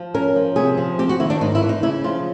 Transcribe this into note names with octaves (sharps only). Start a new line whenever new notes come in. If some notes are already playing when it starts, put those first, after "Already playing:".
Already playing: F3
C#4 A#4
F3
C3 G#4
F3
C4 G4
F#4
D#3 E4
D4
G#2 D#4
E4
E3
D#4
C#3 E4
F3 F4